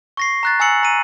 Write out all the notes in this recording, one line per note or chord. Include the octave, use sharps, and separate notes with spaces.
C#6 A#6 C7
A#5 F#6 A6
G#5 A#5 E6 C#7 F#7
A#5 D#7